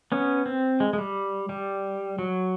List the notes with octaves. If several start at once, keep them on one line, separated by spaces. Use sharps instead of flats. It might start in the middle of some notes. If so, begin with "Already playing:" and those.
B3 C#4
C4
G#3
G#3
G3
G3
F#3